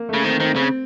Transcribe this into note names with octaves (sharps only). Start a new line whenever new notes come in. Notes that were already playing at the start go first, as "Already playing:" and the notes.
Already playing: A#3
C#3 A3
D#3 C4
D#3 C4
C#3 C4